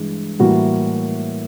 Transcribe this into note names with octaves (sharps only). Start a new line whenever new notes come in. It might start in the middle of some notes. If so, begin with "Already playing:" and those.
Already playing: G2 E3 G#3
A2 E3 G3 A#3 F#4